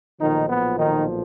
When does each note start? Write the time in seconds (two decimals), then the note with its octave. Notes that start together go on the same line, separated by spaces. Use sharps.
0.21 B1 A#2 D#3 F3 D#4
0.50 B3
0.79 D#3 D#4